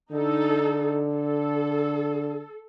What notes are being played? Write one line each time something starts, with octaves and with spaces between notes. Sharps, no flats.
D3 D#4 A4
A4